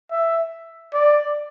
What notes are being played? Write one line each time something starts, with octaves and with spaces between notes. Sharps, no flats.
E5
D5